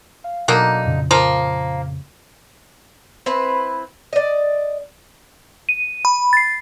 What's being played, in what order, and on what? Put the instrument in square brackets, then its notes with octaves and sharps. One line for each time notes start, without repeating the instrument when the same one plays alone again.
[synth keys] F5
[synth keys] B2 F#3 [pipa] D3 A#3 D#4
[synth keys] F2 A#2 C#3
[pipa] F3 A#3
[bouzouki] C4 E4 B4
D5 D#5
[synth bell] D#7
B5
A6 C7